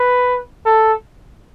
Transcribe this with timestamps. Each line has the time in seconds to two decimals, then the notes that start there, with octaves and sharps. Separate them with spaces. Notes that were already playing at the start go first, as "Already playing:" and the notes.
Already playing: B4
0.66 A4